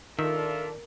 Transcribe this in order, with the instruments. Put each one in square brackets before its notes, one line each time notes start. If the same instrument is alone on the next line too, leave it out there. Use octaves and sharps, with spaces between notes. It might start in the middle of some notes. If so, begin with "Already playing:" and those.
[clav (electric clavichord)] D#3 [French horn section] D4 F4 A4 [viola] A#4 [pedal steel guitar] E5